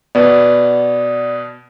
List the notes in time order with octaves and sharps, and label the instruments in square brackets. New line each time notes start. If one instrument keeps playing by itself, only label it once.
[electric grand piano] B2 B3 [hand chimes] D5